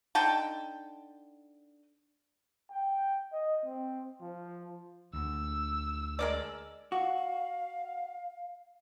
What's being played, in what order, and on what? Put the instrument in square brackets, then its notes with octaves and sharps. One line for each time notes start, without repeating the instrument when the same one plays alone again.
[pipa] D3 D#4 G5 A5
[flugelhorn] G5
D#5
C4
F3
[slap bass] D2 [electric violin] E6
[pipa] G#3 A#4 D5
[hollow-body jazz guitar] F#4 [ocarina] F5